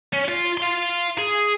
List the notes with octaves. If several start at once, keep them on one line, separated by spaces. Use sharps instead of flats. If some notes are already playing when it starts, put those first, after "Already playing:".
C#4
F4
F5 C6
G#4